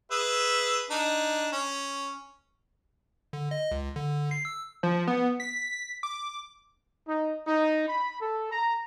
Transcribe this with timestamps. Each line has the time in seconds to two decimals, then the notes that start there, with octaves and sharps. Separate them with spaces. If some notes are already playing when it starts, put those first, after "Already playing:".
0.11 G#4 B4 E5
0.90 D4 D#4
1.52 C#4
3.33 D3
3.51 D#5
3.71 C#2
3.96 D3
4.31 C7
4.45 E6
4.83 F3
5.07 B3
5.40 B6
6.03 D6
7.08 D#4
7.46 D#4
7.88 B5
8.21 A4
8.52 A#5